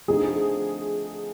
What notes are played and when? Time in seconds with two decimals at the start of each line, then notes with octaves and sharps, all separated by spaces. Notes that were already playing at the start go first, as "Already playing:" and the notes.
0.08 D3 F3 A3 C4 D#4 G#4